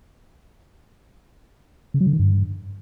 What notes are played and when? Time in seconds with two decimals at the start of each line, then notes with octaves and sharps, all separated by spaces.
1.94 C#3
2.01 F#3
2.07 D3
2.13 D#3
2.19 G2